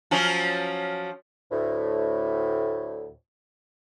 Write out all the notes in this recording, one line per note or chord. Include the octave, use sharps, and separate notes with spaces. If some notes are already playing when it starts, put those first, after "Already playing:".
F3 F#3 C#4
D2 A2